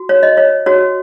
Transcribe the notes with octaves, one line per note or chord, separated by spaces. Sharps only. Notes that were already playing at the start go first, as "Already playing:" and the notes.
Already playing: F#4
C#5
D#5
C#5
F#4 C#5